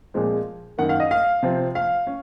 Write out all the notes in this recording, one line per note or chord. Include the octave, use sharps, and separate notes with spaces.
A#2 F3 G#3 C4
F#2 D#3 A#3 F#5
F5
D#5
F5
C3 F3 C4
F5
C#4